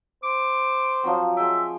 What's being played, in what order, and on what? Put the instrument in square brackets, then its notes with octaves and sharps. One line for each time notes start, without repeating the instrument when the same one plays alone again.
[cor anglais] C5 [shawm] D6
[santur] F3 F#3 C4
[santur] G#3 G5 [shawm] E5